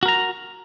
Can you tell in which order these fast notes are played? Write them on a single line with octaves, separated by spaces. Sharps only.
F#4 A#4 A#5